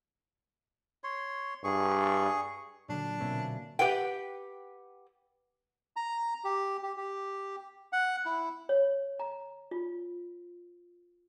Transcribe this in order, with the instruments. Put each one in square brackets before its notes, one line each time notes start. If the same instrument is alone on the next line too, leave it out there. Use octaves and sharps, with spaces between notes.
[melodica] C#5 C6
[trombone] G2 [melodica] G#4 C#6
[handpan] A#2 [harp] D3 F#3 [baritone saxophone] D4
[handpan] B2 A#3 C4 [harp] C#4 B4 E5
[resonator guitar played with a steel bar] G4 B4 F#5 G5
[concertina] A#5
G4
G4
G4
F#5
E4
[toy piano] C#5
A#5
F4